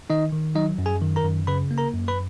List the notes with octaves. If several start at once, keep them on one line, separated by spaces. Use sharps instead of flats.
D#3 D#4 D#5
D#3
F#3 D#4 D#5
F#2
G#4 G#5
D#3
A#4 A#5
F#2
C#3 B4 B5
A#3
A#4 A#5
F#2
B4 B5